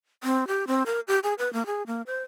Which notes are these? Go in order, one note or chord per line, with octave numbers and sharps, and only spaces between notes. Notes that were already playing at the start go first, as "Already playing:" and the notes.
C4
G4
C4
A#4
G4
G#4
B4
A#3
G#4
A#3
C5